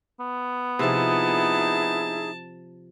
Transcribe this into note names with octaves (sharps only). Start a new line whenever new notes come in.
B3
C3 F3 D#4 E4 G#4 A5